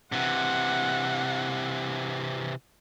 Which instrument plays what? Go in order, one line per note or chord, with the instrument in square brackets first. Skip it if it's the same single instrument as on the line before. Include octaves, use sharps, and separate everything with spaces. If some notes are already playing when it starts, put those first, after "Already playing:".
[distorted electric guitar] C3 E3 [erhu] F#5